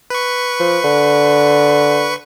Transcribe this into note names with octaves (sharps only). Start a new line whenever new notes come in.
B4 C#6
F3
D3